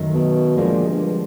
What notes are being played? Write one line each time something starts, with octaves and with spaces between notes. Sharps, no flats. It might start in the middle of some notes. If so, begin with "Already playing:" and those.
Already playing: F#2 D#3 F#3 A3
B2
A#2 D3 F3 G#3
G2